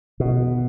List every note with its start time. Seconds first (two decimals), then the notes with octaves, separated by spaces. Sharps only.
0.20 B2